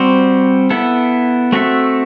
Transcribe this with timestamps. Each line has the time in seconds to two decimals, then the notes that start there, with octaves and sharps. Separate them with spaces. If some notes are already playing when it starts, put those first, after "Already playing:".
Already playing: G3 C4 F#4 C5
0.70 B3 E4 A4
1.52 A3 C4 F#4 A4 E5